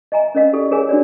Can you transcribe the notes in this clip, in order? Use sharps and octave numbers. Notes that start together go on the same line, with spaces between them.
D#5 E5 G#5 A#5
C#4 A#4 D#5 F5
E4 G4 A4 D5
G#4 A#4 C#5 F5 G#5
D4 F#4 C#5 D5